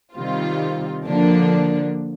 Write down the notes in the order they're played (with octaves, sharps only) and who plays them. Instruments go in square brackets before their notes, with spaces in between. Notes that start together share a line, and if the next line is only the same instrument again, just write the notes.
[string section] C3 D#3 G3 C4 F4
D3 F3 A#3 D4